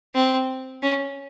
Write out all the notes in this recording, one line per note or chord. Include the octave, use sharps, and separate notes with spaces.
C4
C#4